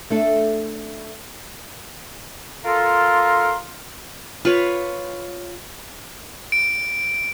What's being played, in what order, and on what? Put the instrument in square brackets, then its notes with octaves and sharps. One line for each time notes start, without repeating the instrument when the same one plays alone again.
[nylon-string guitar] A3 D4 A4
[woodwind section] F4 A4 A#4 C6
[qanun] F4 B4 C#5
[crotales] D7